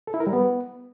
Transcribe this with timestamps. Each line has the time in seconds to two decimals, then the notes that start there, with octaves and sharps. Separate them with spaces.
0.07 A4
0.14 E4
0.20 A#4
0.27 G3
0.33 B3